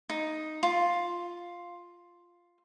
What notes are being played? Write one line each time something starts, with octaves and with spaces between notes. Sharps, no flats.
D#4
F4